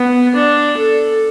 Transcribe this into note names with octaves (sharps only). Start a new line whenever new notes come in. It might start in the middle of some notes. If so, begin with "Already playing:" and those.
Already playing: B3
D4
A4